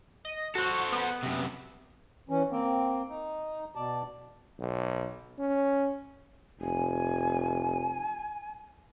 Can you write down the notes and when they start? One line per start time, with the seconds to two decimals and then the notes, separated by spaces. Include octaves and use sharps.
0.25 D#5
0.55 F#4 A4 C5
0.92 B3
1.23 F#2 C3
2.29 E3 C#4
2.51 A#3 C4
3.09 D#4
3.76 B2 D5 A5
4.59 B1
5.39 C#4
6.60 F1 G#5